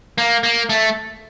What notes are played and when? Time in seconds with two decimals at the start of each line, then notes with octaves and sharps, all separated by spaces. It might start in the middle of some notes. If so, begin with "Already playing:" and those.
0.18 A#3
0.43 A#3
0.70 A3